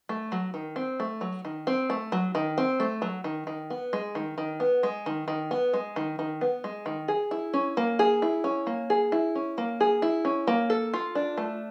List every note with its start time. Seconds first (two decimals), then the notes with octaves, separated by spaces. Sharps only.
0.09 A3
0.32 F#3
0.54 D#3
0.76 C4
1.00 A3
1.21 F#3
1.45 D#3
1.67 C4
1.90 A3
2.12 F#3
2.35 D#3
2.58 C4
2.80 A3
3.02 F#3
3.24 D#3
3.47 D#3
3.70 B3
3.93 G#3
4.15 D#3
4.38 D#3
4.60 B3
4.83 G#3
5.06 D#3
5.28 D#3
5.51 B3
5.73 G#3
5.96 D#3
6.19 D#3
6.41 B3
6.64 G#3
6.86 D#3
7.08 G#4
7.31 E4
7.53 C#4
7.77 A#3
7.99 G#4
8.22 E4
8.44 C#4
8.67 A#3
8.90 G#4
9.12 E4
9.35 C#4
9.58 A#3
9.80 G#4
10.02 E4
10.25 C#4
10.47 A#3
10.70 A4
10.94 F4
11.15 D4
11.37 A3